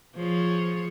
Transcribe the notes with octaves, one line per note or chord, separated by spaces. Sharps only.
F3 G#4 C#5